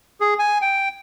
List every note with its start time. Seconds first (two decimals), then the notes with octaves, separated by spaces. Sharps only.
0.21 G#4
0.39 G#5
0.62 G5